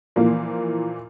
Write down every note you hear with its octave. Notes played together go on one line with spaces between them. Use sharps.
A#2 E3 F3 A#3